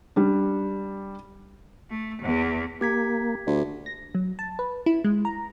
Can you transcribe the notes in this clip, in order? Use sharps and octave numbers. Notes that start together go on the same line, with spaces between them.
G3 D4
A3
E2
A#3 G4 G#6 B6
D2
A#6
F#3
A5
B4
E4
G#3
A#5